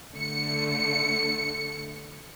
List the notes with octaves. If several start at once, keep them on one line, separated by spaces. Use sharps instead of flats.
D3 A3 C#7